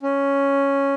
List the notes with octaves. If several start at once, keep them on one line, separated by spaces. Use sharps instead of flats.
C#4